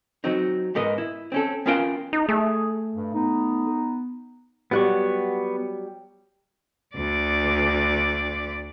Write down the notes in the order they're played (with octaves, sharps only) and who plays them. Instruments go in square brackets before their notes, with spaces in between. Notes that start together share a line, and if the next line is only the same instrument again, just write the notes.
[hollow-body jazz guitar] F#3 C4 D#4
G#2 B3 A#4 D#5
E4
C4 C#4 A4
B3 C#4 F4 A#4 F5 G5
[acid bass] D#4
[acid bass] A3 [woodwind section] G#4
[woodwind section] G2
B3 D#4
[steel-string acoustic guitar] F#3 G3 G4 [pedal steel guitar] B3 F#5 C#6
[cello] D2 D5